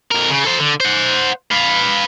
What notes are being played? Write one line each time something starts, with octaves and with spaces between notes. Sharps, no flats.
F2 A#4
C#3
A4 C5
D3
C5 F#5
B4 F5